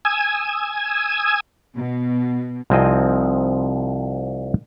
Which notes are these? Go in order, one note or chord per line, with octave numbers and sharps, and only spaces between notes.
G#5 D#6 E6 G#6
B2
C2 F3 C4 D#4 D#5 G#5